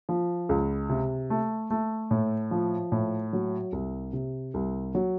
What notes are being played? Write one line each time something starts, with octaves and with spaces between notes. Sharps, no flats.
F3
C#2
C3
A3
A3
A2
F3
A2
F#3
C2
C3
C2
F#3